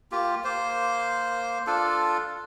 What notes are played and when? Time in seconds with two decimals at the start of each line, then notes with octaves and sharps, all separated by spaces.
0.12 A#3 F4 G4
0.44 A#3 C5
1.67 D4 F4 A4